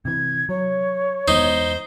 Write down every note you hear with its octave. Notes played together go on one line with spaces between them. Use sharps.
C3 E3 G#6
F#3 C#5
E2 G#3 B3 D#4 C5